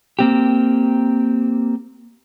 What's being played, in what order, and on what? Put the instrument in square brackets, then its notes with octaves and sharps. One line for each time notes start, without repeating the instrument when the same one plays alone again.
[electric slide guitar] A#3 C4 G4